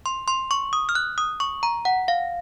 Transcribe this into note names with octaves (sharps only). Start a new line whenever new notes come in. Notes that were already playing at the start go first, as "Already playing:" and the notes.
C6
C6
C#6
D#6
F6
F#6
D#6
C#6
A#5
F#5
F5